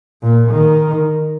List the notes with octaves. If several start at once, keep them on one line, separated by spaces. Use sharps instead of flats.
A#2
D#3